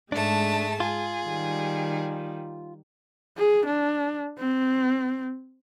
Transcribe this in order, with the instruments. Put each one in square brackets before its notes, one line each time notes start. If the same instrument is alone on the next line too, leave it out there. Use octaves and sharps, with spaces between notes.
[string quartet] G#2 A3 A5 [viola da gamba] G#3 [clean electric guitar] D4
[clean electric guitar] F4 [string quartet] G#4
[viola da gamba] D#3 G3
[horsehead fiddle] G#4
D4
C4